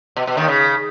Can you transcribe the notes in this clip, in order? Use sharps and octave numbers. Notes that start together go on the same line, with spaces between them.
B2
B2
D#2 D#3
C#3